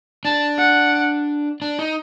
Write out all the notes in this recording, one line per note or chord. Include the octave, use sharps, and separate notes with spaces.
D4 A5
F#5
D4
D#4